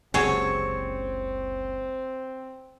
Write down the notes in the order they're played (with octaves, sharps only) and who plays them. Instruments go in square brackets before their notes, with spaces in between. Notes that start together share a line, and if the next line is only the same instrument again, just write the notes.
[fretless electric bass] F#1 C#2 C3 [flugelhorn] C4 [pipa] F#4 G#4 A4 [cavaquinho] C#5